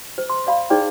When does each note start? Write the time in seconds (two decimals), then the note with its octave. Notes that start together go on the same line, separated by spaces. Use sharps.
0.18 C5
0.30 C6
0.47 D5 F5 B5
0.70 D#4 G#4 C5 D5 G5